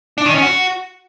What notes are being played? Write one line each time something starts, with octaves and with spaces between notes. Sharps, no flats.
D4
D#3
C#4
F#4